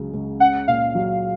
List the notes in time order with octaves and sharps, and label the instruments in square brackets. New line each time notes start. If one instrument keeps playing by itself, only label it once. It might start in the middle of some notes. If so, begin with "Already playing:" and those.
Already playing: [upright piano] C#2 C#3 F#3
C#2
[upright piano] C#4 [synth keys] F#5
[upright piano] A#2 [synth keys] F5
[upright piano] F#3